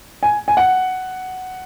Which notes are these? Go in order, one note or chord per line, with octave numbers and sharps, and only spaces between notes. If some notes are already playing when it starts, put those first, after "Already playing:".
G#5
G#5
F#5